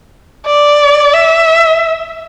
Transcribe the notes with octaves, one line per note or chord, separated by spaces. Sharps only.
D5
E5